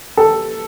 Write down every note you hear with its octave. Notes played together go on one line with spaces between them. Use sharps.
A4